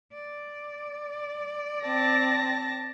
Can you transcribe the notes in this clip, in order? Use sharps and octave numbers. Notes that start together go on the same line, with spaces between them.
D5
C4 A5 A#6